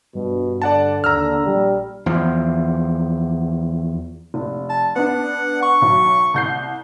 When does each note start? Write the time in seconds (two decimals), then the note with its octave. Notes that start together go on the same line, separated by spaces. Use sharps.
0.15 G2 B2
0.62 D3 D5 F#5 A5
1.04 D#2 A#5 E6 F6
1.46 A#1 G3
2.06 E2 F3
4.34 F1
4.69 A5
4.96 B3 D4 F#5
5.62 C#6
5.82 B1 F#3
6.34 C2 G6 C7